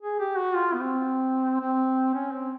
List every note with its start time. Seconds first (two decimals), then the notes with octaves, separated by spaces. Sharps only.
0.01 G#4
0.20 G4
0.37 F#4
0.55 F4
0.73 B3
0.81 C4
1.60 C4
2.15 C#4
2.31 C4